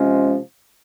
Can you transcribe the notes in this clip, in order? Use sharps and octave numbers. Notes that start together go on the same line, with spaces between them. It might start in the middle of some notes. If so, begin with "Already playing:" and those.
Already playing: C3 F3 G#3 C#4